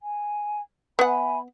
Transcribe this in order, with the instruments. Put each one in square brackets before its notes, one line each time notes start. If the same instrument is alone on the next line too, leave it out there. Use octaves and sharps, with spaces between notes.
[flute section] G#5
[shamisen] B3 F#5 [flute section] E5 G#5 B5